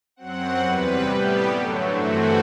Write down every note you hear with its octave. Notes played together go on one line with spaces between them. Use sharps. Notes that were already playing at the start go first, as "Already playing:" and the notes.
F#2 F#3 C4 F#5
E2 C3 G3 B4
A2 G3 B3 G4
F#2 D3 F#3 A3
G2 E3 A3 C4 F#4